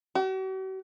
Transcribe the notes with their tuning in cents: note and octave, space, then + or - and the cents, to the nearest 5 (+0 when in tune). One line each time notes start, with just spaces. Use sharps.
F#4 +45